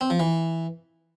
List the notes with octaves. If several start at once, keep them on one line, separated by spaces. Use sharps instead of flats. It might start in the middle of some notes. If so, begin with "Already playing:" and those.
C4
F3
E3